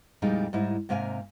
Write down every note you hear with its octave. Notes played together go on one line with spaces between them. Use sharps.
F2 A#2 G3 G#3 D#4
G#2 G3 D#4 E4
G#2 C3 A#3 F5 G#5